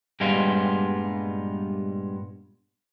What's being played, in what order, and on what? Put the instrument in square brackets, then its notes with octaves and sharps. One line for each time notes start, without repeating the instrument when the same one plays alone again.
[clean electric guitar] G2 A#2 G3 G#3 B3 F4